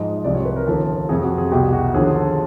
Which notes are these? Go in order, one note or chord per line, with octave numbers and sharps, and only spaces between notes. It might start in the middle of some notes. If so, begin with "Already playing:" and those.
Already playing: G#2 F3 D#5
D#5
C2 C3 F3 D5
C#5
B4
A#4
D#2 C#3 F3 A4
F2 C3 F3 G#4
F#4
G#4
C2 B2 G4
F#4
D#2 D3 F3 G#4
A4